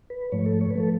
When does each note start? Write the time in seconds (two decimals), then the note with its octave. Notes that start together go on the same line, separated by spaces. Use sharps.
0.10 B4
0.32 G#2 F3 A3 C#5
0.46 A4
0.61 C#5
0.70 B4
0.76 F3 A3 A4